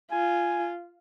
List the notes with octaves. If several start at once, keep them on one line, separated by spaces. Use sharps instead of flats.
F4 G#5